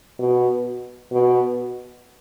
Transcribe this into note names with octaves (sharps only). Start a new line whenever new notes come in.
B2
B2